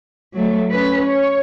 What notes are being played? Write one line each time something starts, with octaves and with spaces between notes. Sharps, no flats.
F#3 A3
C#4 B4
C#5